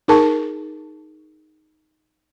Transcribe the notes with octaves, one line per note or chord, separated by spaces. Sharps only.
D#4 G#4 A#4 A5 C#6